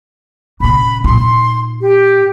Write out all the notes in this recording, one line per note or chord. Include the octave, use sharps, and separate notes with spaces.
A#2 C#3 B5
A#2 D#4 C6
G4